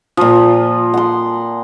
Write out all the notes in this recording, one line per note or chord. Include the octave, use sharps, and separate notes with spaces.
A#2 F3
F#5 C6